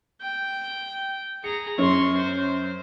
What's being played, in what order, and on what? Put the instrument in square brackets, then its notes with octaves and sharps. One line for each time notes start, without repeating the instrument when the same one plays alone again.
[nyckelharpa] G5
[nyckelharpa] G#4 A#5 [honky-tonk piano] C#7
[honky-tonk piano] F#2 C#4 [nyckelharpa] C6 C#6
[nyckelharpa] C5